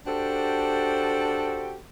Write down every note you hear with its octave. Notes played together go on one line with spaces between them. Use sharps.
D4 F#4 G4 A4 C5